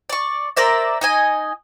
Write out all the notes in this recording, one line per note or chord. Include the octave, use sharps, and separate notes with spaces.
D5 C#6
A#4 C5 D5 E5
D#4 D#5 G#5